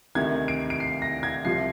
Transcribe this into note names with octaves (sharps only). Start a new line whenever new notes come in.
D2 C3 D#3 G#6
D7
D7
C7
A#6
G#6
C2 C3 F3 C7